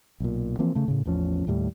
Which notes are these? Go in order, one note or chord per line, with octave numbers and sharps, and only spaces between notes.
B1 A#2
E3 F3 A#3 C4
C#3 A3
A2 C#3
A1 E2 F3 C#4
D#2 A2 G3